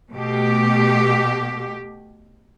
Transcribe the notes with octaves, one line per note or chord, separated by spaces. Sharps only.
B2 A3 G4